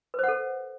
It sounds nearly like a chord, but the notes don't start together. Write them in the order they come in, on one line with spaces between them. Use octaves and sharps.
B4 C5 F#5 A4